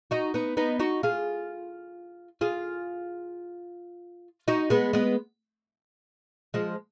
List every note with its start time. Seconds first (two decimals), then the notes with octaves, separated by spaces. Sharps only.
0.11 D#4 F#4
0.34 B3 D#4
0.57 B3 D#4
0.80 D#4 F#4
1.03 F4 G#4
2.41 F4 G#4
4.48 D#4 F#4
4.70 G#3 B3
4.93 G#3 B3
6.54 F3 G#3